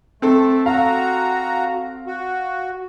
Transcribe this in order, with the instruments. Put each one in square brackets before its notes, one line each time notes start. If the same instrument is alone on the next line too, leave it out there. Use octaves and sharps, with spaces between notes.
[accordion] A3 [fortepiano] C4 A4
[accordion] F#4 A#5 [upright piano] F5
[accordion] F#4